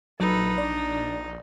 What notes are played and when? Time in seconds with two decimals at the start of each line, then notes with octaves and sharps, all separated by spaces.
0.20 A#1 F#3 D#4 A4 B4
0.58 D4 D5